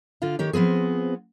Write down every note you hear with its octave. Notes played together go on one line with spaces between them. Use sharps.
D3 F4 F5
D#3 G4 C#5
F3 B3 C4 G#4